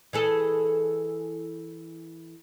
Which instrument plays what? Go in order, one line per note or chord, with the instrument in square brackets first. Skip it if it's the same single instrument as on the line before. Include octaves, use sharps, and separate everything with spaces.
[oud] E3 G#4 A4